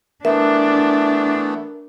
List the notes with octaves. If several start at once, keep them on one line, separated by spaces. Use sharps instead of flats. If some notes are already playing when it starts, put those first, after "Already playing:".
E3 A3 B3 D4 A#4 E5